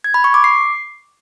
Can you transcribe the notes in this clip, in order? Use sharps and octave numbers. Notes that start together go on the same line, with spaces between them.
G#6
B5
C#6
D6
C7